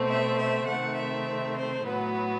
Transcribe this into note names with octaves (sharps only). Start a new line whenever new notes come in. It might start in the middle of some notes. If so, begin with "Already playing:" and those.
Already playing: B2 A3 C4
E5
E5
C3 D#3 A3 C4 F#5
E5
C5
A2 F#3 B3 B4